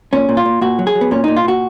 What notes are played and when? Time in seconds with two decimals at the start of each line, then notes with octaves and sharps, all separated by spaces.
0.13 A#2 C#4
0.29 A#2
0.37 F4
0.46 A#2
0.61 A#2 F#4
0.79 F#3
0.87 G#4
0.95 F#3
1.01 B3
1.11 A#2 C#4
1.24 A#2 D#4
1.37 F4
1.45 A#2 F#4